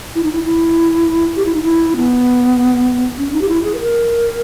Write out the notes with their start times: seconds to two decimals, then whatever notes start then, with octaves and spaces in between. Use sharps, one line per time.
0.15 E4
0.23 D#4
0.32 E4
0.45 E4
1.36 G4
1.45 E4
1.54 D#4
1.63 E4
1.97 B3
3.18 C#4
3.33 D#4
3.41 G4
3.49 E4
3.64 G#4
3.75 B4
3.79 A#4